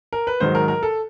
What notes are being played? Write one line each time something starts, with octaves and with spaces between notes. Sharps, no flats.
A#4
B4
G#2 D#3 F#3 C5
A#4
A#4
A4